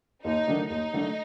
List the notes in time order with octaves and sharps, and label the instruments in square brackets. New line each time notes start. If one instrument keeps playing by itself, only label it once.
[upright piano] D#2 [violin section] D#4
[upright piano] D#3 F#3 A3 D4
[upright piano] D#2 [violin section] D#4
[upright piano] D#3 F#3 A3 D4